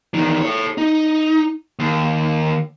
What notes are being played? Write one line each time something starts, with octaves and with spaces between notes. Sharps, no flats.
E2 D#3
A4 C#5
D#4
D#2